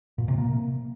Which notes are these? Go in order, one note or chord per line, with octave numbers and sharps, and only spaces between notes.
A#2
C3
A#3